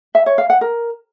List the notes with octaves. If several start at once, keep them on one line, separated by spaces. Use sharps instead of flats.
E5
C#5
F5
F#5
A#4